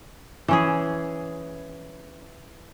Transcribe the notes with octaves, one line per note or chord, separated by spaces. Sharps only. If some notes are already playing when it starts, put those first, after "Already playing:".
E3 C#4 G#4